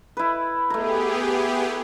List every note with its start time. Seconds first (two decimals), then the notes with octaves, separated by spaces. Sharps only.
0.17 E4 B4
0.70 A3 B3 G4 G#4 A#5